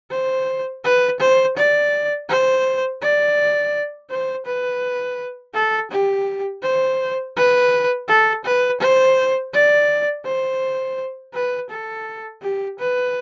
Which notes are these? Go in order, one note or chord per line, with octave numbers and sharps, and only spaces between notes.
C5
B4
C5
D5
C5
D5
C5
B4
A4
G4
C5
B4
A4
B4
C5
D5
C5
B4
A4
G4
B4